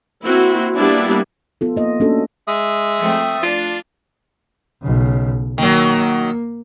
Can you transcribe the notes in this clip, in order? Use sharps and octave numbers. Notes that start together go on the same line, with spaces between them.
A#3 C4 E4 F#4
G3 A#3 B3 D4 E4
B3 F4 A4
A#3 D#5
A3 A#3 C#4 D4 F#4 A4
G#3 E5 D#6
F3 A3 C4
D4 F4
B1 C#3
D#3 F#3 A#3